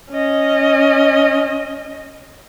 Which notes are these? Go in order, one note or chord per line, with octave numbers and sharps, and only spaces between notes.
C#4 D#5